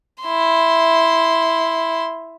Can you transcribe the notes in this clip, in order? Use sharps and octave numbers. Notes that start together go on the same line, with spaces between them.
E4 C6